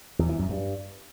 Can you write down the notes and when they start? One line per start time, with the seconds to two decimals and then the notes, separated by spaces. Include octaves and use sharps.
0.19 E2
0.29 E3
0.39 F#2
0.49 G2